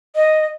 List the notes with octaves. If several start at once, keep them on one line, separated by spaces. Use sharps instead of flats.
D#5